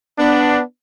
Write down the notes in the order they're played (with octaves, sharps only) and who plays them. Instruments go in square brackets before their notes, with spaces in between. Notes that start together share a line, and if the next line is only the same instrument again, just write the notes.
[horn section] B3 D4